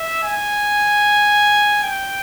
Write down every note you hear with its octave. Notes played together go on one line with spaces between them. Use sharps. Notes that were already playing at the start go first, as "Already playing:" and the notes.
Already playing: E5
G#5
G5